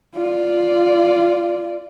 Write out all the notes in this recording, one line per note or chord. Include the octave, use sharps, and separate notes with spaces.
F4 D5